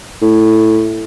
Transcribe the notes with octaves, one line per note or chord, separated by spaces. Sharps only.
A2